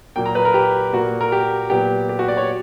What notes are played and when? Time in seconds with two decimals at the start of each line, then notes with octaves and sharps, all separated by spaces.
0.16 A#2 F#3 A#3 G5
0.26 A#5
0.35 B4
0.45 A#4
0.54 G4
0.93 A#2 A#3 F#4
1.21 A#4
1.32 G4
1.70 A#2 F#3 B3 G4
2.09 G4
2.19 F#4
2.28 D5
2.37 C#5